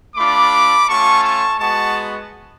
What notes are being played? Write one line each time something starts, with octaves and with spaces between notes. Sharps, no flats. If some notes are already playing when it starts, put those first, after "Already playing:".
A3 D4 F4 B5 D6
A3 C#4 F4 A5 C#6
A5 C#6
G#3 B3 F#4 A5 C#6